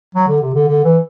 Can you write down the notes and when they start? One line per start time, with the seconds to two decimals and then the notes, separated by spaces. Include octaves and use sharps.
0.15 F#3
0.28 D3
0.42 C3
0.54 D3
0.68 D3
0.84 E3